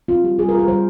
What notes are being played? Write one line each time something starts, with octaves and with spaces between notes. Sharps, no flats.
C4 F4
G3 G4
G3 G#4
A#4
F4
A#4
G3 C5